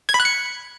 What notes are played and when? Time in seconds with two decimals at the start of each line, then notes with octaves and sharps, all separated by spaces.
0.09 G#6
0.14 B5
0.20 F#6
0.25 C#7